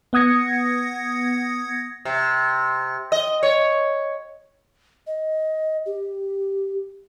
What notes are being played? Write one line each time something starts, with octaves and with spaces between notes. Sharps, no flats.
B3 F#5 D#6 G#6 A#6 C#7
C3
D#5
C#5
D#5
G4